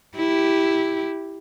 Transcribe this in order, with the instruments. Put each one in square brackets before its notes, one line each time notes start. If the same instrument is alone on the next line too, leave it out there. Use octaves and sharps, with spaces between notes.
[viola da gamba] E4 G4